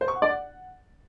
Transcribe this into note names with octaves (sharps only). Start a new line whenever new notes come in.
C5
C#6
F#5
D5
F#5